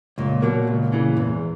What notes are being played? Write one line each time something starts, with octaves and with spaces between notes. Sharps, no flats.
C#2 A#2
B2 F#3 A#3
C#2
C#3 E3
E2 G#2